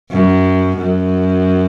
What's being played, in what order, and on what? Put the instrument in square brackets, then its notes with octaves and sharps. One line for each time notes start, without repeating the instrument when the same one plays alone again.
[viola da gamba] F#2
F#2